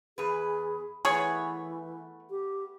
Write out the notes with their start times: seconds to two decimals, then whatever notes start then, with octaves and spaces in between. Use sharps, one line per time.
0.18 E2 G#4 B4
1.05 E3 A3 B3 G#4 C#5
2.30 G4